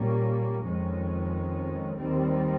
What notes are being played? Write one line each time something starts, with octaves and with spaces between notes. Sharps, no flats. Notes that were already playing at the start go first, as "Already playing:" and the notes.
Already playing: A#2 G3 A#3 C#4
F2 D#3 G#3 C#4
D#2 D#3 G3 C4